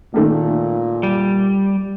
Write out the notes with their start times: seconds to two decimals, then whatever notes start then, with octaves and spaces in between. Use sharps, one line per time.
0.14 A#2 D#3 A3 A#3
1.03 G3